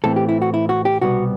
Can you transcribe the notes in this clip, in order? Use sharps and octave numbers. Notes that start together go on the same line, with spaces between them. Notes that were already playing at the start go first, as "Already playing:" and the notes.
A2 E3 A3 C4 A4
G4
E4
F#4
E4
F#4
G4
C2 B2 G3 B3 F#4